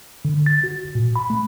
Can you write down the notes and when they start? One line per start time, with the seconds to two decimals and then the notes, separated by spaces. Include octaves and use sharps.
0.25 D3
0.46 A6
0.64 F#4
0.95 A#2
1.16 B5
1.30 A3